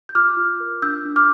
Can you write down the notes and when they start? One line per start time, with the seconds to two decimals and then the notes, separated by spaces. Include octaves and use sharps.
0.09 G6
0.15 F4 D6 F6
0.37 F4
0.60 A#4
0.82 D4 E6 G6
1.05 D4
1.16 D6 F6